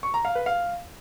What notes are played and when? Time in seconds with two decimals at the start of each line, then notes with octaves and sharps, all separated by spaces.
0.03 C#6
0.14 A#5
0.25 F5
0.35 B4
0.46 F5